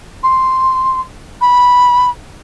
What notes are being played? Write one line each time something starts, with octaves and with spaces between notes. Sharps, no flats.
C6
B5